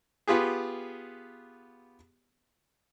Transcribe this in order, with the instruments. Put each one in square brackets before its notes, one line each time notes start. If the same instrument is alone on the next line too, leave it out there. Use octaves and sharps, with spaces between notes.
[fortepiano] B3 F4 G4 G#4